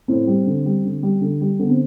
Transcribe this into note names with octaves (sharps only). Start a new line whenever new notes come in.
A2 C4
G3
D3
G3
D3
G3
D3
G3
D3 B3
C4